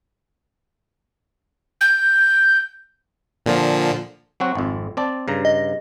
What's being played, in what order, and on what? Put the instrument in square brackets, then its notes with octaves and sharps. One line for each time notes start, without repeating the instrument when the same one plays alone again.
[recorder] G6
[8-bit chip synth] A#2 D3 F3
[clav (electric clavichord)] F#3 C4 F#4
G#1 F2
C4 D5 A5
G2 C#3 A#5
[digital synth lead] D#5